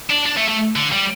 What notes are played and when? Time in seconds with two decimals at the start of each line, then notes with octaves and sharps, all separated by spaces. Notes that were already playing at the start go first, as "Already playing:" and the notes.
0.10 D4
0.26 D4
0.37 A3
0.48 A3
0.76 D3
0.92 G3